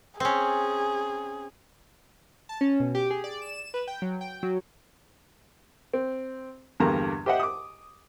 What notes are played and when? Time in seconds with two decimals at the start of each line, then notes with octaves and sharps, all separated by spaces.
0.20 C4 C#4 G#4
2.49 A5
2.61 C#4
2.80 B2
2.95 G4
3.10 G#4
3.24 D5
3.42 E7
3.74 B4
3.88 G5
4.02 F#3
4.21 G5
4.43 F#3
5.94 C4
6.80 E2 G2 D3 A#3 A#5
7.26 G4 C5 D#5 E5 F#5
7.40 D6 D#6